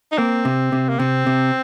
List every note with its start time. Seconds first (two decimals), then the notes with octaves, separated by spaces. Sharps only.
0.12 D#4
0.18 A#3 C4
0.45 C3
0.72 C3
0.89 A#3
0.99 C3 C4
1.27 C3